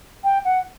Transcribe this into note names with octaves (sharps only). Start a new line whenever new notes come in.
G5
F#5